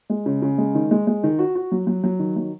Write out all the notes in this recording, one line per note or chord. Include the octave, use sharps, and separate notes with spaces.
G#3
C#3
C#3
G#3
D#3
G#3
G#3
D#3
F#4
F#4
F#3
F#3
F#3
D#3
F#3